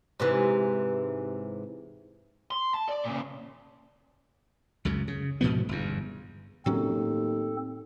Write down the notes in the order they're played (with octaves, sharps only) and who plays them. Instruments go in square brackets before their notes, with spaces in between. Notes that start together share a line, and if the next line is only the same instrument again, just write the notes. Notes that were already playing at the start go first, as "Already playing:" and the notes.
[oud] G#2 C3 E3
[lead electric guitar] C6
A5
D5
A#2 C#3
[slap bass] C#2 F#2 C#3
C#3
G#2 B2 F3 B3
G1 E2
[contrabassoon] D#2 [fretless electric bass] A2 F#3 C#4 [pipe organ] C4 A4